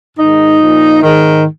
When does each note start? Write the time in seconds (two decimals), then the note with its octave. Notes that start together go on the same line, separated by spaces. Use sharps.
0.18 G#2 D#3 D#4
0.60 A#2 F3
1.02 G#2 D#3